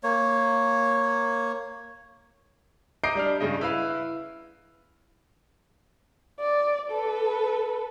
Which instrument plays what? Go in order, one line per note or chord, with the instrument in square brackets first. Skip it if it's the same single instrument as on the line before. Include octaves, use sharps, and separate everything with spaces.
[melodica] A#3 C#5
[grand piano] D#5 A#5 D6 G6 C7 D7
G3 D4 F6
G2 C#3 C#4 D#5
E4 B4 F5
[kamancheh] D5
A4 B4